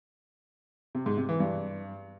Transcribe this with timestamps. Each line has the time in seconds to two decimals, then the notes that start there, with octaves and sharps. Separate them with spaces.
0.95 C3
1.06 G#2
1.17 C3
1.29 E3
1.40 G2